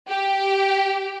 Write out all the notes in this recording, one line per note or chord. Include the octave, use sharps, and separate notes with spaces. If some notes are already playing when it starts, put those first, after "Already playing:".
G4